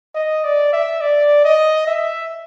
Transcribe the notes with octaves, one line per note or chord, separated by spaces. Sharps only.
D#5
D5
E5
D5
D#5
E5